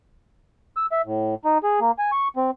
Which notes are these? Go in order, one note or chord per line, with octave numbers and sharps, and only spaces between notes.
E6
E5
A2
D#4
G#4
A#3
G#5
C#6
C4